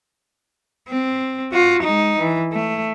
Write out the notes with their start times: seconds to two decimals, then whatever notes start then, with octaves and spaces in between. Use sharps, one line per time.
0.89 C4
1.52 F4 F#4
1.82 G#3 D#4
2.19 E3
2.52 A3